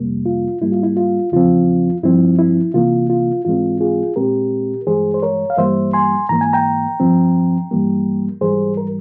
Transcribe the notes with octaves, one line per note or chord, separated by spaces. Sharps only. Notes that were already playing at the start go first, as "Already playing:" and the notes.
Already playing: F2 C3 G3 A#3
F4
G#2 G3 A#3 E4
F4
E4
F4
E2 C#3 F3 C4 F4
G2 F3 C4 E4
E4
C3 E3 A#3 F4
F4
G#2 E3 G#3 C4 F4
F4 G#4
A#2 G#3 C4 G4 A#4
G2 E3 G#3 G#4 C5
C5
A#4 C#5
F5
G2 E3 G3 A#3 C5 E5
G#5 C6
G#2 E3 A#3 A#5
G#5
G5 A#5
G2 F3 C4
G2 E3 G3 A#3
G#2 E3 G3 G#4 C5
A#4